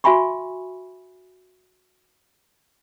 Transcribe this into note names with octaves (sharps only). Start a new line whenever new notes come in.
F#4 E5 G#5 B5 C#6